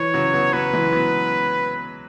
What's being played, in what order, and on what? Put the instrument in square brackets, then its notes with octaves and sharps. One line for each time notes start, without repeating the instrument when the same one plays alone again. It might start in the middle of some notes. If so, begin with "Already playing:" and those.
Already playing: [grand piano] E3 [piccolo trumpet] C#5
[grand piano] C#3 F#3
F#3 B3
[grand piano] C#3 F#3 [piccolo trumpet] B4
[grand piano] E3 G#3
F#3 B3